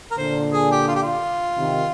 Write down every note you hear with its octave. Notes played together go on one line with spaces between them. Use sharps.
A#4
A#2 D3 C5
G#4
G4
F4
G4
F4
C3 D#3